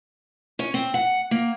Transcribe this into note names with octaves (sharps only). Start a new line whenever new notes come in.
C#4
C4
F#5
A#3